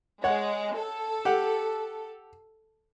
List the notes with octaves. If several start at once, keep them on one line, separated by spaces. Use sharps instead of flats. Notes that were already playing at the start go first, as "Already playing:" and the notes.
G#3 C#5 F#5
A4
G4 F#5